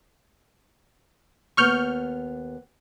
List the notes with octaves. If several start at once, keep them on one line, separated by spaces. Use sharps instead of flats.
D#2 B3 C#6 F6 G6